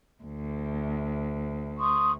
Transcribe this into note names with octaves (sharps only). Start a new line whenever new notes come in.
D2
C6 C#6 D#6